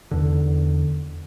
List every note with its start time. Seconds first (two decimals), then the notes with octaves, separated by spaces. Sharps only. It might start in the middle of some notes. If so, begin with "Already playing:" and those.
0.11 E2 D3